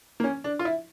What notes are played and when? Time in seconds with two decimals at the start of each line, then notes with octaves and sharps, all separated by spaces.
0.20 A#3
0.24 C#4
0.44 D4
0.59 F4
0.65 E4